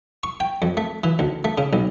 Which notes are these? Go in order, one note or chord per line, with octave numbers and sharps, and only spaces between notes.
C#6
G5
F2
A3
E3
D2
A3
C#3
B1